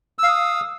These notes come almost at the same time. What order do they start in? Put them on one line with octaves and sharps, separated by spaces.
E6 F5 D#6